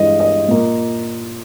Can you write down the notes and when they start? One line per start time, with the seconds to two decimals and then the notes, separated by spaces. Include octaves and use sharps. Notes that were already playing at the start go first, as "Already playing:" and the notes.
Already playing: G2 E3 G#3 D#5
0.20 D#5
0.48 A#2 A#3